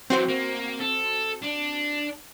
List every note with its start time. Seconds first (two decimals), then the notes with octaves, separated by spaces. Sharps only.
0.10 E3 F#3 C4 F#4 C5
0.28 A#3
0.80 A4
1.42 D4